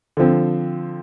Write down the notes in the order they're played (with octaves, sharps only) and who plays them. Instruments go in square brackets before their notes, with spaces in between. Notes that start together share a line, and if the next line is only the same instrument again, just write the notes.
[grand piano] D3 F3 C4